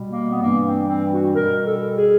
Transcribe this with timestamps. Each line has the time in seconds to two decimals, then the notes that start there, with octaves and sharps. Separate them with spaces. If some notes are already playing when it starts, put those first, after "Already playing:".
Already playing: B2 G3
0.10 A#3
0.31 B3
0.41 G2 E3 G3 A#3
0.65 C4
0.89 C4
1.12 F#4
1.35 B2 G3 A#4
1.66 A4
1.97 G#4